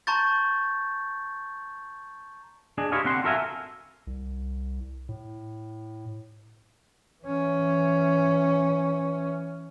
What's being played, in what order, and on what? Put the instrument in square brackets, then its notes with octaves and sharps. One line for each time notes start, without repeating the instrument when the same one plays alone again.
[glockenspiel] A5 A#5 C6 C#6 G6 A6
[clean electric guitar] D4 G#4 D#5
E4 G4 C5 C#5 D#5 F5
D3 C4 F#5 C6
F#4 A4 A#4 E5 F5 G#5
[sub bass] C2
A2
[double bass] E3 C#4